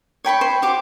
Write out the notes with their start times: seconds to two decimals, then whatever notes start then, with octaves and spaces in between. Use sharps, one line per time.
0.25 C#5 G5 B5 C#6
0.41 C5
0.62 F#4 G4 D6